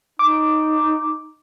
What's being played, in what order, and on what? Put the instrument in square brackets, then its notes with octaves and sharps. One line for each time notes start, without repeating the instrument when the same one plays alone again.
[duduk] D#4 [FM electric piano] D6